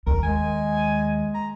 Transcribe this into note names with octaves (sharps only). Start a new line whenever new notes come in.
D#2 A#4
G#3 G#5
A#5